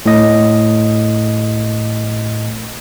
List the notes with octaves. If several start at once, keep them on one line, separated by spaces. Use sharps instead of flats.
A2 D#5